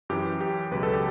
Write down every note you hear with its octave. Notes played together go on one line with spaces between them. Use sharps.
F#2 E3 G4
G4
C#2 B2 F#3 B4
A4
G4